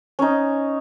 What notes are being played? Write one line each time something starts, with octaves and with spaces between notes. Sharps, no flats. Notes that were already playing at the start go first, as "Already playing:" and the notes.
C#4 D#4